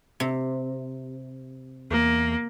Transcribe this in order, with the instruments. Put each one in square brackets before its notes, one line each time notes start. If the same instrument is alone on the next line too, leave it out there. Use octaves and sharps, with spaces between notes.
[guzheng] C3
[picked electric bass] E2 [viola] A#3